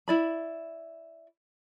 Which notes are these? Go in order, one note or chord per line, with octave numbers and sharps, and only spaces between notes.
E4 D5 B5